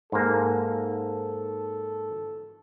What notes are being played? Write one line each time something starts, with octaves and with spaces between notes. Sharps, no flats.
G#2 A#3 A4